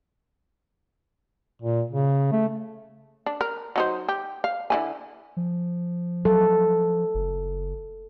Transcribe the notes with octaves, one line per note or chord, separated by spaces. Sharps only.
A#2
C#3
A3
D4
A#4
F#3 D#4 C5
G4
F5
D3 E4 G#5
F3
F#3 A4
F#1